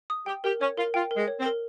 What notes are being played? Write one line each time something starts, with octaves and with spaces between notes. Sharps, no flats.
D#6
G4 G5
G4 A#4
C#4 C#5
F4 A#4
F4 G5
A#4
G#3
C#5
C4
A#4